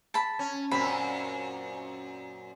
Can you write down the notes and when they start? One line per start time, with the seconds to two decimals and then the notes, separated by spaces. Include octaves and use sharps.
0.14 A5 B5
0.39 C#4
0.71 F#2 A#2 C4 B5